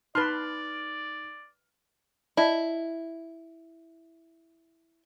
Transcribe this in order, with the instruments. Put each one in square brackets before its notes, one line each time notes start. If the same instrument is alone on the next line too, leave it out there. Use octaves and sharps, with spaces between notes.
[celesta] D#4 [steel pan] B4 A5 C6 [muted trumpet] D5 [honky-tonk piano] F6
[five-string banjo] E4 [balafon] D5 D#5 A5